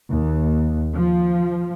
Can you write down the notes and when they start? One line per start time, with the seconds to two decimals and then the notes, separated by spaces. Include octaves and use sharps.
0.10 D#2
0.94 F3